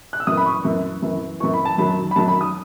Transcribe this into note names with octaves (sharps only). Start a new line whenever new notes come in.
F#6
E6
F#2 E3 D#6
B5
C#6
F#2 E3
F#2 E3
F#2 E3 C#6
B5
A5
F#2 D#3 F#3 B5
B5
F#2 D#3 F#3 A5
B5
D#6